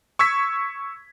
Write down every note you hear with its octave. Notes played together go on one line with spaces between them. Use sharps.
C#6 E6 G#6 B6